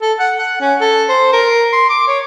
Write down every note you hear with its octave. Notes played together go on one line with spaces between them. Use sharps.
A4
F#5
F#5
C#4
A4
C5
A#4
C6
D6
C#5